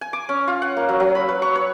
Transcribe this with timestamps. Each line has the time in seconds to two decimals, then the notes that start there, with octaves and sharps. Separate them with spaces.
0.01 G#5
0.13 D6
0.29 C#4
0.47 F4
0.62 F#5
0.77 A#3
0.89 F#3
1.00 F#3
1.15 B5
1.29 B4
1.42 C#6
1.55 C#5